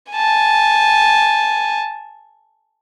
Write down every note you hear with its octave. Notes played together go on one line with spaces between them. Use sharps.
G#5 A5